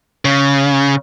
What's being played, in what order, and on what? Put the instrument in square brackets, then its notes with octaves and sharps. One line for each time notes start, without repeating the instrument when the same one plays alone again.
[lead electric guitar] C#3